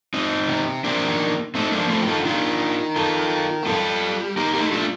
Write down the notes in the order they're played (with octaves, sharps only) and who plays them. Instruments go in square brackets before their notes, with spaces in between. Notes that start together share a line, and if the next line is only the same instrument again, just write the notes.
[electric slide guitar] C4 D#4
[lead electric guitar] C3
[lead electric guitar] C3 [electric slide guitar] A#3 D4
[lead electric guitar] D#3
[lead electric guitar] A3 [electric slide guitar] C4 D#4
[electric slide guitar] A#3 D4
[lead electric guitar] F3
[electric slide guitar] A3 C4
[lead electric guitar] D#3
[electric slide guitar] F4 A4
[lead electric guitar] D3
[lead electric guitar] D#3 [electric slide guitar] D4 F4
[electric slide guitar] F4 A4
[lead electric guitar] A3
[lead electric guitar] G3 [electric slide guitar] F4 A4
[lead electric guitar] A#3 [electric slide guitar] D#4 G4
[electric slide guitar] D#4 G4
[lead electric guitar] A3
[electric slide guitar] D4 F4